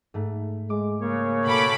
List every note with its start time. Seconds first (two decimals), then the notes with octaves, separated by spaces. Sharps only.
0.14 G#2 A3
0.70 G#3 D6
1.01 C#3 A#3 C#5
1.46 B2 A4 B5 D6